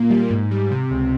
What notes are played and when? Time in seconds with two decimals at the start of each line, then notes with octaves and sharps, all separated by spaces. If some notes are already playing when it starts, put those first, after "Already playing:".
Already playing: A#2 A#3
0.10 G3
0.30 G#2
0.51 G3
0.71 C3
0.91 C#2